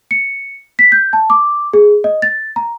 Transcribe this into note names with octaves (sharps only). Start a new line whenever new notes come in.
C#7
B6
G6
A5
D6
G#4
D#5
A6
A#5